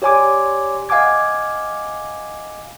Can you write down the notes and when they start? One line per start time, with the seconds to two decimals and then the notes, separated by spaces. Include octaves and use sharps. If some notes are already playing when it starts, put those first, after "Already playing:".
0.02 G4 C#5 D5 G#5 C6 D6
0.89 D#5 F5 F#5 G#5 D6 G#6